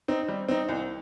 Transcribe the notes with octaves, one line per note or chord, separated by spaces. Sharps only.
C4 D#4
G3
C4 D#4
C2